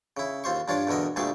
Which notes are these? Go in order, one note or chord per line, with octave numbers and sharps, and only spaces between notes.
C#3 E4
D#2 F4 C5 C#6
G2 D4 F4 C#5 D5
E2 B2 D3 A#4 D#5
D2 A#2 G3 A3 G#4 C#6